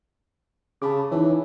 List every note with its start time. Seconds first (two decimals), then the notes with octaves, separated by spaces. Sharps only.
0.82 C#3 A5 B5 D6
1.11 E3 D#4 C#5